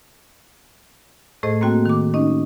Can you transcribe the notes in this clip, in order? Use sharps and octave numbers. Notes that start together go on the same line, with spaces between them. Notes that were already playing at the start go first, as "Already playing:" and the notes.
A2 A3 G#4 A4 C5 D#5
A#3 C4 F#4 G5
D#3 D6
C#4 D#4 D#5